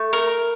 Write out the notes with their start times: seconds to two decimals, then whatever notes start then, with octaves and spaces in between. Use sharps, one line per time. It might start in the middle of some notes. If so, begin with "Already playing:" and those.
Already playing: A3
0.13 A#4